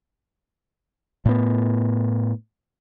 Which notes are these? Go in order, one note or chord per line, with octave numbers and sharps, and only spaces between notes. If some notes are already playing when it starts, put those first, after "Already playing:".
A2 B3